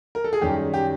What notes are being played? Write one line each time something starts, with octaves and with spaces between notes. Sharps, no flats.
A#4
A4
G#4
F#2 D#3 G3 G4
G4